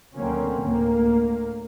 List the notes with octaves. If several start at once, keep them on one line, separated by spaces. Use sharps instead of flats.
D2 D3 F#3 A#3 C4 C#4
D2 A2 A#3